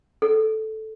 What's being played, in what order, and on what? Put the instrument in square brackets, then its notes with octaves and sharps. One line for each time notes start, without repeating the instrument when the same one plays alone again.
[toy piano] A4